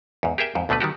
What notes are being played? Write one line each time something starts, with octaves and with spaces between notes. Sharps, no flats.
E2 G#2
G4 G#4 A#4 E5 G5
F2 G#2
D2 B2 D3 A3 B4
D#3 G3 F#4 G4